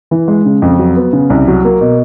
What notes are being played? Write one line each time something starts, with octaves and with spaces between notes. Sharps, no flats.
E3
G#3
C#3
F2
F#3
B3
C#3
C2
F#3
A#3
B2